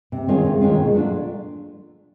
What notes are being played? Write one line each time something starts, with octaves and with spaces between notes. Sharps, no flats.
C3
D#3 G#3 C#4 F4
C3
D#3 G#3 C#4 F4
B2
F#3 A3 D4 F4